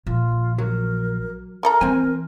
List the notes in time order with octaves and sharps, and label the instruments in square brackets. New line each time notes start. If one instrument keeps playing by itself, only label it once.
[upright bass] A#1 F3 [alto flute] F4
[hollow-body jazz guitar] F#3 [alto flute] A#4
[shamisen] A3 A4 A#5 [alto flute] A#4
[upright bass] E3 [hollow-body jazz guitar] C4 G#5